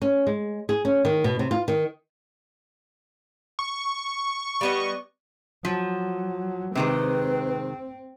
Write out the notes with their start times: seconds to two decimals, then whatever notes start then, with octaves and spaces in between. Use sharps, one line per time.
0.02 C#4
0.27 G#3
0.69 G#4
0.85 C#4
1.05 D#3
1.24 B2
1.39 C3
1.51 F4
1.68 D#3
3.59 C#6
4.61 G3 B3 D#5
5.65 F3 F#3
6.75 C3 D#3 G#3 C4 B4